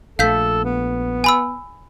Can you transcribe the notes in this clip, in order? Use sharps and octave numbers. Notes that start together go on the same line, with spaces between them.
A#1 A3 A4 F5 G6 B6
B3
G#5 B5 E6